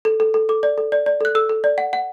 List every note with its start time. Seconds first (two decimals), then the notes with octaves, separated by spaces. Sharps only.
0.05 A4
0.20 A4
0.34 A4
0.49 A4 D6
0.63 D5
0.78 A4
0.92 D5
1.06 D5
1.21 A4 F#6
1.35 A4 E6
1.49 A4
1.64 D5
1.78 F#5
1.93 F#5